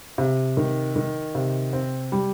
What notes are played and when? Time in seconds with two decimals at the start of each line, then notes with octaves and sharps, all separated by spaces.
0.18 C3
0.57 D#3
0.96 D#3
1.35 C3
1.73 C4
2.12 G3